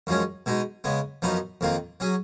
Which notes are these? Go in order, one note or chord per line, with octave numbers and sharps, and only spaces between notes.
F#2 F3 G#3 C#4
B2 G#3 D#4
C#3 G#3 B3
F#2 F3 B3 D#4
F2 D#3 A#3 F4
F#3 C#4 G#4